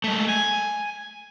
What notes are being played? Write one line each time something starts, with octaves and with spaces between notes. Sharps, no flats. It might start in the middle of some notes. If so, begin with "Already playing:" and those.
G#3 A3
G#5